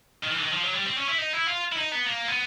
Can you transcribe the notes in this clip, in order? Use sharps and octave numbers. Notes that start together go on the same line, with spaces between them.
D#3
E3
D3
D#3
F3
F#3
G3
C4
C#4
E4
D#4
E4
F4
E4
D#4
B3
A#3
B3